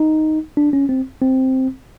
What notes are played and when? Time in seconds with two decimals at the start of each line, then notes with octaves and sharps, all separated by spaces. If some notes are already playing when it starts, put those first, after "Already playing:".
Already playing: D#4
0.57 D4
0.73 C#4
0.89 C4
1.22 C4